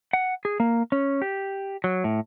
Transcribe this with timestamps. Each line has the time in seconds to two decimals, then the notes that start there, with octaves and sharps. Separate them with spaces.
0.13 F#5
0.45 G#4
0.60 A#3
0.92 C#4
1.22 G4
1.84 F#3
2.04 A2